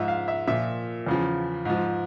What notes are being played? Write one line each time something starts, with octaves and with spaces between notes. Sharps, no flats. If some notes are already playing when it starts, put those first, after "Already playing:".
Already playing: G#2 F3 E5
F5
E5
A#2 F3 E5
E2 C#3 F3
G#2 F3